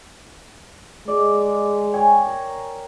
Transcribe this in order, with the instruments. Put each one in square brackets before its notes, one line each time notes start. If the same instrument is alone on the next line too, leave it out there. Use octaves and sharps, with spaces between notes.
[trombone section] G#3 [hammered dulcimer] D5
[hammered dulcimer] C#5 G5 G#5
A#4